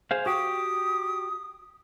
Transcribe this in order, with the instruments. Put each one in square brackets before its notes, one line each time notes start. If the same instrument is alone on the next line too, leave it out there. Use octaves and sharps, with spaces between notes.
[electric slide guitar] G#4 C5 F5
[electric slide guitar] F#4 G4 G5 [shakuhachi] D#6